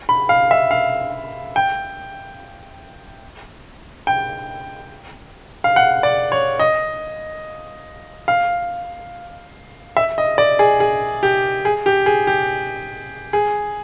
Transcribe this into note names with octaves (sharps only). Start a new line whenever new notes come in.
B5
F5
E5
F5
G5
G5
F5
F#5
D5
C#5
D#5
F5
E5
D#5
D5
G#4
G#4
G4
G#4
G4
G#4
G4
G#4